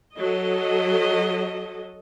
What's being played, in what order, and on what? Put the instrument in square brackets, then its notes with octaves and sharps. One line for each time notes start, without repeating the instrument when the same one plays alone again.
[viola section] F#3 A4 D#5